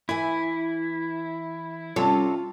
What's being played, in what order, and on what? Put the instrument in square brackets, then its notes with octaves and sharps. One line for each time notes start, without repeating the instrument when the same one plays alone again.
[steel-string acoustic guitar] E3 E5 G#5 [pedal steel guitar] E4
[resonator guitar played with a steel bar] C3 A4 C#5 [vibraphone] G3 C#4 [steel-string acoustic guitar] F4